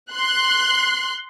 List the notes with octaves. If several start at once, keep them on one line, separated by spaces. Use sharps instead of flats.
C6 F#6